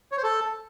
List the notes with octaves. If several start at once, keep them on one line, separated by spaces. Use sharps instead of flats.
C#5
C5
A4